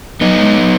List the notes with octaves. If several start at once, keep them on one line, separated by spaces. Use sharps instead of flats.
F#3 B3 D#4
G#3
F#3